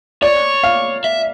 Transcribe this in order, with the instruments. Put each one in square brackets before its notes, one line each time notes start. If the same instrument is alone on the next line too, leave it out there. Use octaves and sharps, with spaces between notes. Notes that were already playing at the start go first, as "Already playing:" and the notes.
[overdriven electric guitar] C#5 [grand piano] D5
[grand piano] F5
[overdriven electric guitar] E5